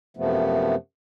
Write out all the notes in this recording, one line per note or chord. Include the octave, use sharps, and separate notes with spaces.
F#2 C3 F3 A3 B3